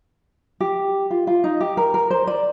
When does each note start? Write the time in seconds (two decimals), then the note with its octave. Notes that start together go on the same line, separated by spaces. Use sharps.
0.60 G4
1.10 F4
1.27 F4
1.44 D#4
1.61 G4
1.77 A#4
1.94 A#4
2.10 C5
2.27 D5